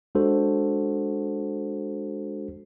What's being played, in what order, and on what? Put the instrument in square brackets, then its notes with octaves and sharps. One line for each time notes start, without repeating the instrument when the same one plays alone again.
[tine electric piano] G#3 D4 F#4 A4 C5